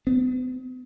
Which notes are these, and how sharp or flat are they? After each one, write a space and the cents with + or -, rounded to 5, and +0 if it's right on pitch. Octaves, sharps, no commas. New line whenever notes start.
B3 +45